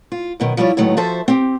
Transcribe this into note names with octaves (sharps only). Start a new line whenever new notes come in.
F4
F#2 B2 D#3
F3 G3 E4 F4 C#5
A2 D#3 F#3 A3 B3
F3 F#4 A4 C5 E5 A5
C4 G4